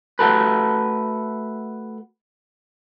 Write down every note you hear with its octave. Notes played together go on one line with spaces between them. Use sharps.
A3 F#4 A4 B4